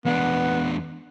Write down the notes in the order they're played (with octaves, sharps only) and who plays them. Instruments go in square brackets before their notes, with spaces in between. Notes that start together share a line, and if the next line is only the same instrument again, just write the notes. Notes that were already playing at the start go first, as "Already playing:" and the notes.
[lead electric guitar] E2 D4 [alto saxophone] B3